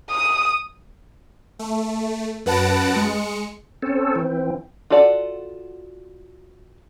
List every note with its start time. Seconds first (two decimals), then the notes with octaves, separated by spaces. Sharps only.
0.11 D#6
1.59 A3
2.46 F#2 B4 F#5 A5 A#6 D7
2.96 G#3 C#7
3.82 C4 C#4 A4
4.15 E3 C4
4.90 F4 F#4 A4 D5 F#5